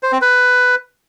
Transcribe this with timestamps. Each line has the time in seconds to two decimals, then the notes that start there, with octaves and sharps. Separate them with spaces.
0.03 C5
0.12 C4
0.22 B4